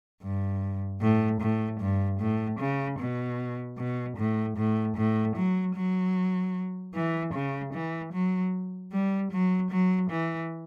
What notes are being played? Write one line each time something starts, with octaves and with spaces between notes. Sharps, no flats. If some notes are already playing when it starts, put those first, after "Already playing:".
G2
A2
A2
G2
A2
C#3
B2
B2
A2
A2
A2
F#3
F#3
E3
C#3
E3
F#3
G3
F#3
F#3
E3